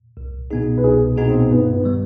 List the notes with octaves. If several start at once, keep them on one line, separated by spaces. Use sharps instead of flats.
C2
B2 B3 D#4 G#4
B4
C2 G#4
B2 B3 D#4 G#4
C4
G2 B3
B3
D#3 G3 B3